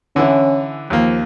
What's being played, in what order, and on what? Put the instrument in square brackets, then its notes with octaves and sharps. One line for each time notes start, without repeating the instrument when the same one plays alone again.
[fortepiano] D3 E3 E4 [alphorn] C#4
[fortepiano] D#2 A#3 [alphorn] F3